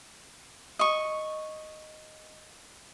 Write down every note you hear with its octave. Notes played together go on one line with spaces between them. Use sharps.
D#5 C#6